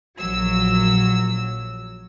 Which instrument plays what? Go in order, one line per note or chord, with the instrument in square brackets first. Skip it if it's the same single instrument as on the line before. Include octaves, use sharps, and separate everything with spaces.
[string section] A#1 F#3 E6